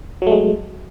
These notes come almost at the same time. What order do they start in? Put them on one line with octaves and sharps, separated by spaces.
F#3 A3 G#3